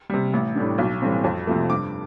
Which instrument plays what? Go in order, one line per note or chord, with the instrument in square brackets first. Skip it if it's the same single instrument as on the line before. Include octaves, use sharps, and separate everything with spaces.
[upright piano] C3 G3
A1
A2 G3 D4
B1
A2 E3 G3 C4
F2
C3 F3 A3
G2 D6